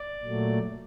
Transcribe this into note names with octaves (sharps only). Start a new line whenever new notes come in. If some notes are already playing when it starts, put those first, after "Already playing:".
Already playing: D5
A#2 F#3 A3